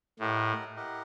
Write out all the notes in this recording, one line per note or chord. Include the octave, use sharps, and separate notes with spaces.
A2 E4 G4 A#4 D#5 F#5
E4 G4 A#4 D#5 F#5